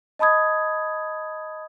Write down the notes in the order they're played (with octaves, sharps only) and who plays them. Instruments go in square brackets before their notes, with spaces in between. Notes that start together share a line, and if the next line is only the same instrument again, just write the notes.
[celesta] D#5 A5 B5 D#6 G#6